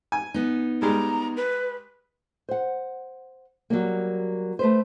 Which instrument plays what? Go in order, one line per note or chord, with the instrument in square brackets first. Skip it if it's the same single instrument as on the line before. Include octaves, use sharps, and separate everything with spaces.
[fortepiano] G#5
[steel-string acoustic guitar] B3 D#4
[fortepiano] G3 G#3 [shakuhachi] A#5
[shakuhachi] B4
[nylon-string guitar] C5 F#5
F#3 G3 A#3
A3 B4 C5